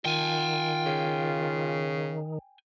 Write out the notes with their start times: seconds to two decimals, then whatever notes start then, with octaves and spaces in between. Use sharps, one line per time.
0.05 D#3 F4 G5 G#5
0.86 C#3